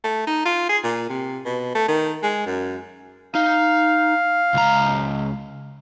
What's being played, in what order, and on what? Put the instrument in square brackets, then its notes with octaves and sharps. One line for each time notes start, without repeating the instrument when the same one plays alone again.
[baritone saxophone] A3
D#4
F4
G#4
A#2
C3
B2
A3
D#3
G#3
F#2
[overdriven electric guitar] D#4 [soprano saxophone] F5
[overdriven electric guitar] C#2 A#5